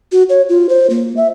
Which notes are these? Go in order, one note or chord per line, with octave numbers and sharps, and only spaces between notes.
F#4
C#5
F4
C5
A#3
E5